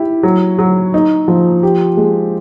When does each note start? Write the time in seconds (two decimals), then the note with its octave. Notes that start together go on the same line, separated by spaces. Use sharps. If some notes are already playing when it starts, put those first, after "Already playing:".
Already playing: E4 G4
0.23 F#3
0.59 F#3
0.94 D#4
1.28 F3
1.63 G4
1.97 G#3